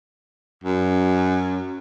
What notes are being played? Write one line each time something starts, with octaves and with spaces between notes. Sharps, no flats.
F#2